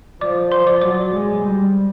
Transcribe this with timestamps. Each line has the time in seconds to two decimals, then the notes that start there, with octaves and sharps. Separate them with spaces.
0.21 F3 D5 D6
0.52 C5 C6
0.67 D5 D6
0.81 F#3 D5 D6
1.12 G#3
1.43 G3